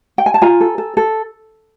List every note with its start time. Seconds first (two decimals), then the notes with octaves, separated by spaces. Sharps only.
0.18 G5
0.26 G#5
0.34 A5
0.42 F4 G#5 A#5
0.60 A4
0.78 A4
0.97 A4